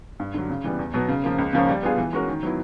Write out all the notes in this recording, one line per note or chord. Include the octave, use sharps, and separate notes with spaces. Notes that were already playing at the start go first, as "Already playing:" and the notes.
G2
D3 F#3
C#3
E3 G3 B3
E2
B2 F#3 B3
C#3
F3 A#3
C#2
C#3 F3 A#3 C#4
G3
B3 D4 F4 G#4
E3
G#3 C#4 F#4 A#4
D#3
F#3 B3 E4